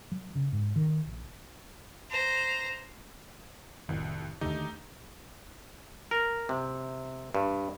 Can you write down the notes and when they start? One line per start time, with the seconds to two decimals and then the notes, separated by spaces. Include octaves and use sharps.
0.12 F#3
0.35 C#3
0.52 G#2
0.76 D#3
1.07 A#1
2.11 C5 A#5
3.89 F1 C2 A2 D#3
4.41 D#2 D3 D#3 A3 D#4 G4
6.11 A#4
6.49 C3
7.35 G2